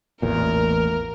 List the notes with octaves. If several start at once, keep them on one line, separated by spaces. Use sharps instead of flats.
A1 E2 A#2 A#4